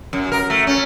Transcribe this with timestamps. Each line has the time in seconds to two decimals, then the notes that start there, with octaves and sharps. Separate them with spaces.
0.13 F#2
0.32 A#4
0.50 A3
0.67 C#4